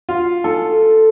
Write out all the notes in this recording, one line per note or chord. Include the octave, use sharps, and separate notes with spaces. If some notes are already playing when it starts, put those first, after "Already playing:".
F4
A4